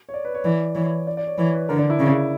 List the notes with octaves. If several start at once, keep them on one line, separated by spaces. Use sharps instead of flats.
C#5
D5
B4
C#5
E3 D5
E3 C#5
D5
D5
C#5
E3 C#5
B4
D3 A#4
D4
E4
C#3